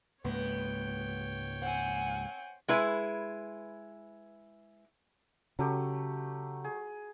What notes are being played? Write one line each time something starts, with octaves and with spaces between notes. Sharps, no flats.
C#2 G#2 A#3 B3 C#5 G5
C4 F#5 G#5
G#3 E4 B4
C#3 F#3 A3 G4
G#4